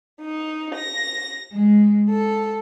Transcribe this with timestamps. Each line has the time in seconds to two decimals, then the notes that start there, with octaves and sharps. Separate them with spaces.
0.21 D#4
0.75 A#6
1.52 G#3
2.10 A4